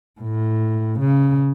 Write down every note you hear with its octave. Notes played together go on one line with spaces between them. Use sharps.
A2
C#3